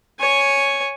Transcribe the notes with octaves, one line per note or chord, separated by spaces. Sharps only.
C#5 G#5